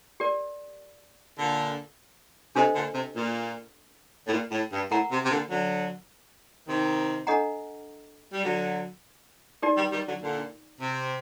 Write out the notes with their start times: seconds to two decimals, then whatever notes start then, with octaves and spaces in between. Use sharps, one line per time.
0.20 G4 A#4 D5
1.37 A#2 D3
2.55 C3 D4 A4 C5 D#5
2.75 A#2 D3
2.94 C3
3.15 A#2
4.27 A2
4.32 A#2
4.51 A2
4.72 G2
4.91 A2 A#4 F#5 A#5
5.11 C3
5.24 C3
5.31 A#2 D3
5.50 D3 F#3
6.68 C3 D#3
7.27 D4 A4 D#5 F#5 A#5
8.33 G3
8.45 D3 F#3
9.62 D#4 G4 A#4 D5
9.77 D#3 G3
9.92 D#3 G3
10.06 D3 F#3
10.22 A#2 D3
10.81 C3